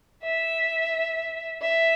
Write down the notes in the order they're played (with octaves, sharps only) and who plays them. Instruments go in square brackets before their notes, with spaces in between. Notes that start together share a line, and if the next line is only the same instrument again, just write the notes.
[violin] E5
E5